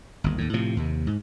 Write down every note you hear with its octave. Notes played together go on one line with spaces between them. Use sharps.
G1 D#2
D#2 A2
A2 C3 F3
D#2 C3
G#2